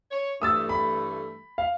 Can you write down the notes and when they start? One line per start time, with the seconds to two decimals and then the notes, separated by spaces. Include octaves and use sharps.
0.11 C#5
0.42 G2 E3 A3 D#6 E6 A6
0.69 B5
1.58 F5